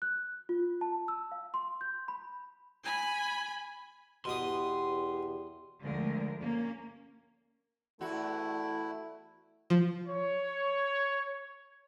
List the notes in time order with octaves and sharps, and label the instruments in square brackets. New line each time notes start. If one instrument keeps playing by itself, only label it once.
[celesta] F#6
F4
A5
E6
F5
C6
G6
B5
[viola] G#5 B5
[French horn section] E2 G4 [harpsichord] B2 D#6 [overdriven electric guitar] C6
[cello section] D2 D3 F3 G#3 A#4
A#3 C#4
[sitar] E2 F#4 [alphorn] A3 [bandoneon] E4
[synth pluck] F3
[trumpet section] C#5